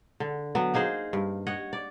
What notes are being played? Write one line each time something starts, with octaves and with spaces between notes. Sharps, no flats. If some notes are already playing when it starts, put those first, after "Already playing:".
D3
F#3 B3
A#3 D#4 G#4 C5
G2
C#5 D#5 F#5
D5